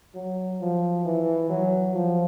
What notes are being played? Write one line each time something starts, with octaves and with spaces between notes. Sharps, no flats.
F#3
F3
E3
F#3
F3